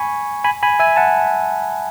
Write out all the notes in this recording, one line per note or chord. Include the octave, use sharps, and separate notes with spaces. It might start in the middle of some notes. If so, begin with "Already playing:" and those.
Already playing: G#5 B5 C#6
G#5 B5
G#5 B5
E5 G#5
F#5 A5